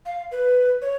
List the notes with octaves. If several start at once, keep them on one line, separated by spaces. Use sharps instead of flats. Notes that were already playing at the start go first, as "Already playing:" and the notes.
F5
B4
C#5